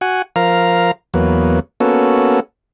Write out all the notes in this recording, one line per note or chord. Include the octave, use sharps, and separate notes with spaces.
F#4 F#5 G#5
F3 A#4 F5 A#5
E2 F#3 A#3 B3
A#3 B3 C#4 F#4 A4